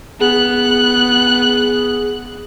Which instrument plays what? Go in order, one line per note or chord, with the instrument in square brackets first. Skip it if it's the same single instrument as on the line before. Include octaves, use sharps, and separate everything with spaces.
[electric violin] B3 F#6 [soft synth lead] G#4